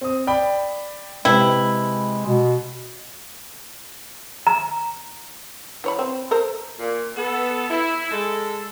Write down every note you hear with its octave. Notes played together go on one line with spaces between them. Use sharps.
C4 D#6
D5 G5 B5
C3 G#3 E4 B4 G5
B2
A#5
E3 C#5 B5
C4
A4 A#4 C5
A#2
B3 A4
E4
G#3 A4